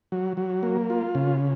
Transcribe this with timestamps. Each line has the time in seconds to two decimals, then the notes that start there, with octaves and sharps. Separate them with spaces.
0.12 F#3
0.37 F#3
0.63 A#3
0.90 F4
1.15 C#3